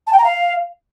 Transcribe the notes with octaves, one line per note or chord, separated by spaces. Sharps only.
A5
G5
A#5
F5